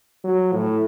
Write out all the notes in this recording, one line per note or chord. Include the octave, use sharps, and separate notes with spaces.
F#3
A2